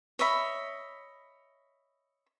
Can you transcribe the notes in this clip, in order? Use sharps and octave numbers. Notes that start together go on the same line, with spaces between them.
C#5 D#5 E5 B5